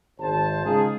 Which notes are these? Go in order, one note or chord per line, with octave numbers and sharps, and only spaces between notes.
G#1 C5 A5
C#3 G#3 D#4 F4 G#4